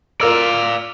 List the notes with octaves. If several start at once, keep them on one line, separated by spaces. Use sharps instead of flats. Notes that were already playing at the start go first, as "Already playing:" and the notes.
F4 A#4 D5 F5 E6